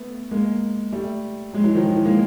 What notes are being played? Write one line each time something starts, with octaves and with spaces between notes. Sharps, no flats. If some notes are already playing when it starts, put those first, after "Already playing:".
Already playing: A3 B3
G#3 A#3
G3 A3
F#3 G#3
E3 F#3
D#3 F3
D#3
E3
G#3 A#3